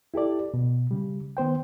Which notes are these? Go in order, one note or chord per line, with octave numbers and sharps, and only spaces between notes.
E4 G4 A4 D5
B2
C#3 G3
D#3 B3 C5 G5